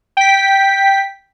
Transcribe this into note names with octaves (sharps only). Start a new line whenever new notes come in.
G5 B6